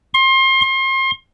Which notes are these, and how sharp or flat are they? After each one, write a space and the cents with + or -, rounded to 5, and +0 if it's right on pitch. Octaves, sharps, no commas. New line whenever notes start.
C6 +30
C6 +35